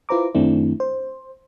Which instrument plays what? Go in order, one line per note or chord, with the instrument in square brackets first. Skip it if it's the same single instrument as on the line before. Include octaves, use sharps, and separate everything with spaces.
[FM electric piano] E4 F4 B4 C5 A#5 D6
F#2 D#3 A3 C4 D4 E4
C5